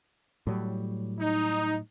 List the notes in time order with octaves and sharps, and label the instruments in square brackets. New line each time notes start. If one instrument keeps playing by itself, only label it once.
[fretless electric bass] A2 F#3 G3
[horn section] D#4